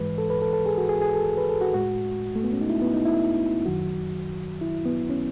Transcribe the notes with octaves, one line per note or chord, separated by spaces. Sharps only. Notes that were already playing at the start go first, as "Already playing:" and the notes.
Already playing: G#2 E3 G#3 B4
A4
B4
A4
A4
G#4
F#4
G#4
G#4
A4
B4
A4
F#4
A2 G#3 F#4
A3
B3
C#4
D#4
E4
B3
D#4
E4
F#2 D#3 F#3 F#4
E4
B3
C#4